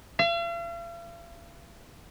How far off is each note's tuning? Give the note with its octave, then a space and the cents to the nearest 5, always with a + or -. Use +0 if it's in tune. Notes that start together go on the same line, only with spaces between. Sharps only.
F5 -45